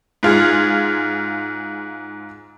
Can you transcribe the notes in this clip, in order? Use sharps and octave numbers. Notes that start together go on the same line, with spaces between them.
G#2 F4 G#4